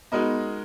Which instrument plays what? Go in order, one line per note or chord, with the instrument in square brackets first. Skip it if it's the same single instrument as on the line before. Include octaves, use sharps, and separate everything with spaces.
[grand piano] G#3 D#4 F#4 A#4 D#5 [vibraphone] B3